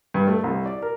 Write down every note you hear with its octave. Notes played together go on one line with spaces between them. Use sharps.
G2
A3
C2
D5
A#4